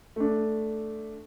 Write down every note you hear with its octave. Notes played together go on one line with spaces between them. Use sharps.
A3 D4